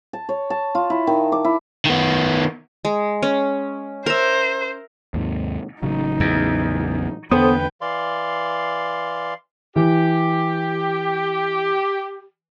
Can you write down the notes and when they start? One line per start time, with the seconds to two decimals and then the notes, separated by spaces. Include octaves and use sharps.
0.13 A5
0.29 C#5
0.50 A5
0.75 F4
0.90 E4
1.07 D#3
1.32 D6
1.44 E4
1.85 D#3 B3
2.85 G#3
3.23 C#4
4.06 A#4 C5 E5
5.14 D#2 G#2 C3
5.83 A1 C#3 F#3 D#4
6.20 E2
7.31 E2 D3 B3 A4 B4 C5 G5 D#6
7.81 E3 D5 F5 C6
9.76 E3 G4